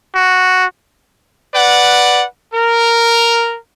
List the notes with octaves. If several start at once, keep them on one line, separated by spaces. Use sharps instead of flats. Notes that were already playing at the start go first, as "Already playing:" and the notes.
F#4
B4 D5 F#5
A#4